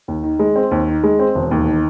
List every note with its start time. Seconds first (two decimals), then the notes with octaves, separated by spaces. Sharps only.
0.08 D#2
0.23 D#3
0.39 G#3
0.56 C4
0.71 D#2
0.88 D#3
1.04 G#3
1.19 C4
1.35 E1
1.51 D#2
1.67 D#3